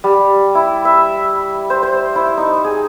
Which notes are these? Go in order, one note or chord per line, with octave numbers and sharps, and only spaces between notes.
G3
E4
E5
C5
C5
E4
D#4
G#4